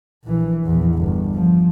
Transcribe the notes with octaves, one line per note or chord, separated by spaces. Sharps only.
A#1 E3
A#1 E2
G1
F3